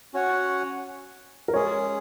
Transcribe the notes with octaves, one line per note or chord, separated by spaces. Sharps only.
C#4 F#4 C#5 F#5
A#4
G#3 C#4 G#4 C#5